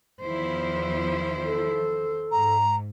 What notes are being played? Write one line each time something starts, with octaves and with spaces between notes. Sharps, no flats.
E2 D#3 F3 E4 C5
A4
G#2 A#5